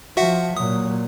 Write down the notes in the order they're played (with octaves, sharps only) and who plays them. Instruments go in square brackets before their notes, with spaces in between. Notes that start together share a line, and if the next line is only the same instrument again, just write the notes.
[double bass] F3 [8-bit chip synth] F#4 E5 F#5
[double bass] A#2 F#3 [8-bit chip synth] D#6